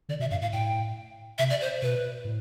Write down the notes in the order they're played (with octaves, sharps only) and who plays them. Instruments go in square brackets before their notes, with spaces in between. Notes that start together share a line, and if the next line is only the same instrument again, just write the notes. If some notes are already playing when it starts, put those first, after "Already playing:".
[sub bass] D3 [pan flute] D5
[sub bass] B2 [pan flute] E5
[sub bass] G2 [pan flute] F5
[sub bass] A2 [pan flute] F5
[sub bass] A2 [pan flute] G5
[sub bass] C3 [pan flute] E5
[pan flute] D5
C5
[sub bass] B2 [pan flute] B4
[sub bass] A2